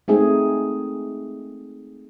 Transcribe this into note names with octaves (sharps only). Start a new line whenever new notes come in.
G#3 A3 C4 D#4 G#4